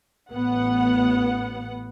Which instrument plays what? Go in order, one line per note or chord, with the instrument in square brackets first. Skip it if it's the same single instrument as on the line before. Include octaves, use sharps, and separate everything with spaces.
[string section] A1 B3 F#5